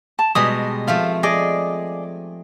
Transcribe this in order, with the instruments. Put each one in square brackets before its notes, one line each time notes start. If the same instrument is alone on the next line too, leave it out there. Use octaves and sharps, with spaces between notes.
[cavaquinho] A5
[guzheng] B2 G3 G#3 [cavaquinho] D#6
[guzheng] F3 A3 C4 [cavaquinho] F5
[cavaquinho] G#4 D5 [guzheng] D#5